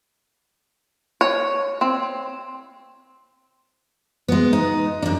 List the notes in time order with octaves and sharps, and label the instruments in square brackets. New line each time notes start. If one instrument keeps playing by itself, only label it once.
[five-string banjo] C#5
C4
[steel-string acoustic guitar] G#3 B3
D#4
F#2 D4